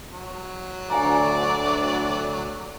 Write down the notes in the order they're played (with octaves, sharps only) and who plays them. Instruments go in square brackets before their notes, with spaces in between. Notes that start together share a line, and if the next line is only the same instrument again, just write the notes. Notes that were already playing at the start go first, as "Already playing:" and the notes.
[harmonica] F#3
[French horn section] D2 [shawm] D5 [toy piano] F#5 G#5 A#5